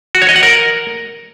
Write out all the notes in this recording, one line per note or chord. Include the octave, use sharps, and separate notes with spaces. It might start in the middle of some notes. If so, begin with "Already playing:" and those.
F#4
C#5
D#5
F#5
A#4